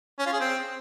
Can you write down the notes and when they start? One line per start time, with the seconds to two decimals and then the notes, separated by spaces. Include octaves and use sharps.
0.19 C#4
0.26 F4
0.33 G#4
0.40 C4